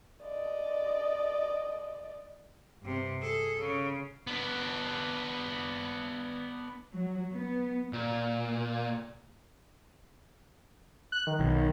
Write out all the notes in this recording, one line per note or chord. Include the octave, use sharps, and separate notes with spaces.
D5 D#5
G2 C3
G#4 A4
C#3
B3 D4
F#3
B3
A#2
F#6
D#3
B1